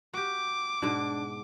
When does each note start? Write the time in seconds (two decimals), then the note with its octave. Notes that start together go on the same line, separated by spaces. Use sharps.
0.14 F#4 G4 D6
0.82 G#2 B2 D4